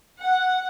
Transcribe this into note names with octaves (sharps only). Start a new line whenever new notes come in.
F#5